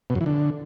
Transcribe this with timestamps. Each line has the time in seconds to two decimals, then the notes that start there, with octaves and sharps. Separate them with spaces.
0.10 B2
0.15 F#2
0.21 E3
0.26 D3